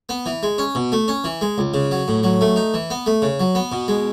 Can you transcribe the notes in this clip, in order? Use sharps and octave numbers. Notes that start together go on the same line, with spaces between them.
B3
E3
G#3
C#4
B2
A3
C#4
E3
G#3
C#2
C#3
F#3
A2
F#3
A3
D#4
E3
B3
A3
C#3
F#3
B3
B2
G#3